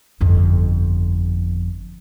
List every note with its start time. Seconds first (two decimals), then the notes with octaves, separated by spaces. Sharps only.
0.21 G1 F2